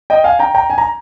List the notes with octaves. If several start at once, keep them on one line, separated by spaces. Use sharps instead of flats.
D#5 G5
F5 G#5
G5 A#5
G5 A#5
G#5
A#5